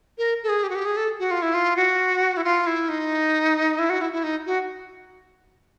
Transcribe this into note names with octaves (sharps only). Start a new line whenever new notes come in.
A#4
A4
G#4
G4
F#4
G4
G#4
A4
F#4
F4
E4
F4
F#4
E4
F4
E4
D#4
E4
F#4
E4
E4
D#4
F#4